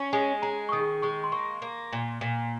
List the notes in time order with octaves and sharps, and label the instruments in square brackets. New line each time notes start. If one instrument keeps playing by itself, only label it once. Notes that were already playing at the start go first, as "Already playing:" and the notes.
Already playing: [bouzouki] C#4
[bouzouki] G#3 [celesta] G#5
[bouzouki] G#4 [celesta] A#5
[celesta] C#6
[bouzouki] D#3 [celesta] D#6
[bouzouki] G#3 [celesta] C#6
[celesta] C6
[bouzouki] A#3 [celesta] C#6
[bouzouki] A#3
A#2
A#2